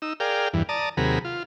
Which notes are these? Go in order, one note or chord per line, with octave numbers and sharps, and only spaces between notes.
D#4 E6
G#4 A#4 D5 F5 G5
E2 G2 E3
D5 A5 A#5 D#6
D#2 C3 F#3 G#4 A#4 B5
F4